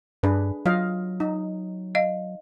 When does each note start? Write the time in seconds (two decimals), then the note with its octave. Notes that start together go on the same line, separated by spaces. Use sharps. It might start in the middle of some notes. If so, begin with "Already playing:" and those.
0.23 G2 D4 G#4 B4
0.66 F#3 F4 D#5 F5
1.20 D#4
1.95 D#5 F5